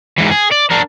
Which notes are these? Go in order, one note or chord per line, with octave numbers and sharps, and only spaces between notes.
G#2 E3
G#4
D5
D4 A#4